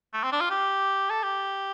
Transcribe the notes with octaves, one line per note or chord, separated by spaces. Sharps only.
A3
C4
D4
F4
G4
A4
G4